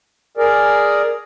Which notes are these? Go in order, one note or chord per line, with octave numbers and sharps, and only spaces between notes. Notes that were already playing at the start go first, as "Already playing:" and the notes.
G#4 A#4 D5